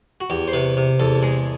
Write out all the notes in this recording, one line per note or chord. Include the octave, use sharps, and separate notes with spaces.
F#4
E2 G4
C5
C3 B4
C3
E2 A4
G#3 G#4